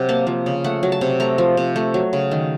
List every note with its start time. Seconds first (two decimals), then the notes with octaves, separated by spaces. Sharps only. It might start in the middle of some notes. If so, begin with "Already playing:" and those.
Already playing: C3 F#3 F#5
0.09 A#3 A5
0.27 F3
0.46 C#3
0.64 A3 F#5
0.83 F#3
0.92 A5
1.01 C3
1.20 A3 A#5
1.38 F3
1.57 C3
1.76 A3
1.94 F#3
2.13 C#3
2.31 D#3